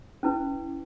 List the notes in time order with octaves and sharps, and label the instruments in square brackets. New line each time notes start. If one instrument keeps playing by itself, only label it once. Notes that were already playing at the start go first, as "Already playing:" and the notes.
[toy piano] C#4 E4 B4